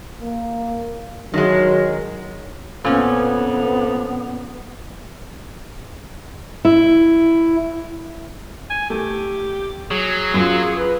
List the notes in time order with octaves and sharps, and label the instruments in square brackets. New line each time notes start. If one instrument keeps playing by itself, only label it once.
[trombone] A#3
[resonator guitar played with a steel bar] D#3 G#3 [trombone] F#3
[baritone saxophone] F2 [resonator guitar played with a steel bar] A#2 C#4 [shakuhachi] B3
[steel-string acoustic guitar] E4
[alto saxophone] G#5
[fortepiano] A3 [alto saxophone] G4
[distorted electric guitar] F#3 [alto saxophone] G#4
[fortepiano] F#2 [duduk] F4
[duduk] B4